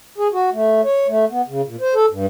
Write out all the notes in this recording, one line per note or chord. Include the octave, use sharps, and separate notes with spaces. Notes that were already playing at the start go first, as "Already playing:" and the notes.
G#4
F#4
A3
C#5
A3
B3
C#3
A#2
C5
A4
G2